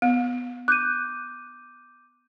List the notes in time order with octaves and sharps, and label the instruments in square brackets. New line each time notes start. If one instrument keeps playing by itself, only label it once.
[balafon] B3
[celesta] D6 G6 D#7 [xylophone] F#6